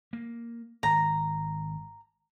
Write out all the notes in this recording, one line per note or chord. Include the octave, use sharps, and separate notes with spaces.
A#3
G#1 A#5